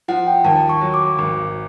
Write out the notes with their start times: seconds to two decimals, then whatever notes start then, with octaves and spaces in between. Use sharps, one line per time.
0.08 F3 F#5
0.27 G5
0.44 D#2 A5
0.69 C#6
0.81 F#3
0.94 D6
1.18 G#1